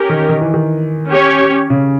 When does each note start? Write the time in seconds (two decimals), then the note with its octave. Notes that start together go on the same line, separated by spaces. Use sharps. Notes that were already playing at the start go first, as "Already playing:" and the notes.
Already playing: C#4 G4 A#4
0.09 D#3
0.29 D#3
0.41 E3
0.54 D#3
1.09 C#4 G4 C#5
1.70 C#3